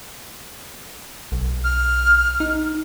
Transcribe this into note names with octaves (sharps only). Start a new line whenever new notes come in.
B1
F6
D#4